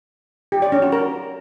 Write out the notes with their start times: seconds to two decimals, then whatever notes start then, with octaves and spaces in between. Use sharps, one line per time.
0.52 G4
0.62 D5
0.72 C#4
0.82 F#4
0.92 A#4